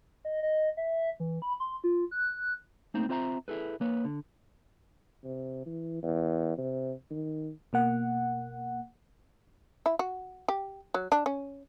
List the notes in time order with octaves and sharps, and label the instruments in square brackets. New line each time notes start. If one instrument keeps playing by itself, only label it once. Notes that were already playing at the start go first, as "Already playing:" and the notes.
[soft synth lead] D#5
D#5
E5
E3
B5
C6
F4
F#6
[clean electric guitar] A3 A#3 C4 D#4
C4 F4 C5 E5 A5 A#5
E4 G#4 A4 B4
A#3 B4 C#5
D3
[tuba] C3
E3
E2
C3
D#3
[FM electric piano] B2 A#3 F#5
[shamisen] E4
F#4
G4
F#3
D4
C#4